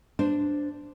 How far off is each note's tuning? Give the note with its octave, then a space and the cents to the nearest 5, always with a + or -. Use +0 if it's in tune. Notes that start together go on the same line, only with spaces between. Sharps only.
D4 +0 C5 -10